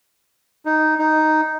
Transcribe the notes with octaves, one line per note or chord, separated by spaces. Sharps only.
D#4
D#4